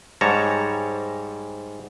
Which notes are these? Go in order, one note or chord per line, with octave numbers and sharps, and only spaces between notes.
G#2 G3 C#5 A5 A#5